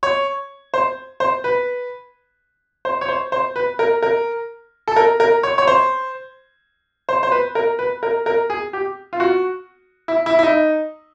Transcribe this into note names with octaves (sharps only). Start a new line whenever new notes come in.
C#5
C5
C5
B4
C5
C#5
C5
C5
B4
A#4
A#4
A4
A#4
A#4
C#5
C#5
C5
C5
C5
B4
A#4
B4
A#4
A#4
G#4
G4
F4
F#4
E4
E4
E4
D#4